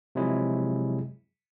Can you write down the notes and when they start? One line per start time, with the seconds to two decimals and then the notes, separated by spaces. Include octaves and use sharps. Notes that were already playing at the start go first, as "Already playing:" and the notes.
0.15 C3 F3 F#3 G#3 E4 G#4